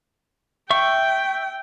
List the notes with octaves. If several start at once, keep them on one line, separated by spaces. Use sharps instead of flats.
E5 G5 C#6